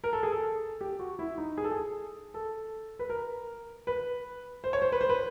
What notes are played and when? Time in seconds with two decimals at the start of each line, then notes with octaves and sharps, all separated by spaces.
0.04 A#4
0.13 A4
0.23 G#4
0.32 A4
0.81 G4
0.99 F#4
1.19 E4
1.38 D#4
1.58 G#4
1.64 A4
1.71 G#4
2.34 A4
2.99 B4
3.10 A#4
3.87 B4
4.64 C5
4.73 C#5
4.82 C5
4.92 B4
5.01 C5
5.09 B4